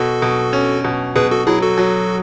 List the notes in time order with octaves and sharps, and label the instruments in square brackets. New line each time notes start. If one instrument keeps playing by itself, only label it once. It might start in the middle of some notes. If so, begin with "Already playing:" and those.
Already playing: [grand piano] B2 [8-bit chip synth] F#4 A4
[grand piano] B2
C#4
B2
[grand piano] B2 [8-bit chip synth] G#4 B4
[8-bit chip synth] F#4 A4
[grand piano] F#3 [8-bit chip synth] E4 G#4
[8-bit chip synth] F#4 A4
[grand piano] F#3